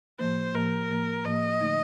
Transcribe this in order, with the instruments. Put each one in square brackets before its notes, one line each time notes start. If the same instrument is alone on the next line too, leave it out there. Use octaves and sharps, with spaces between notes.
[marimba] A2 F3 A#3 [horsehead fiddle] C5
[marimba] A2 F3 A#3 [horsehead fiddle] A#4
[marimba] A2 F3 A#3
[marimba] A2 F3 A#3 [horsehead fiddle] D#5
[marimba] D3 A3 D#4